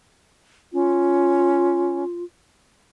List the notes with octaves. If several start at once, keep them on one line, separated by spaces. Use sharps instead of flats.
C#4 F4